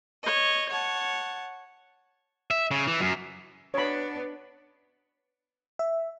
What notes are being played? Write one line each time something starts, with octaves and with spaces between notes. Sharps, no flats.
C#5 D#5
C#5 F#5 A5
E5
C#3
E3
F#2
B3 D4 C#5 B5
E5